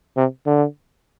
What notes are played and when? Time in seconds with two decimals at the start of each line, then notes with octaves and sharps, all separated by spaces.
0.17 C3
0.46 D3